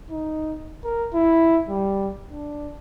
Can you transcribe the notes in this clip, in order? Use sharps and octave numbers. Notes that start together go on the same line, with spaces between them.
D#4
A#4
E4
G3
D4